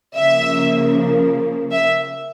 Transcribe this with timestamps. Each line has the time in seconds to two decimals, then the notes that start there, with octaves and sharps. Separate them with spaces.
0.16 C#3 F3 A#3 E5
1.72 E5